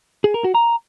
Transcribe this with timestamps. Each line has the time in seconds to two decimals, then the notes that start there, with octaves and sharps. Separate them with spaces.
0.24 G#4
0.34 A#4
0.44 F#4
0.55 A#5